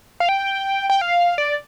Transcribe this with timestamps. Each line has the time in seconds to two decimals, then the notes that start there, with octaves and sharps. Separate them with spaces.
0.20 F5
0.29 G5
0.90 G5
1.01 F5
1.38 D5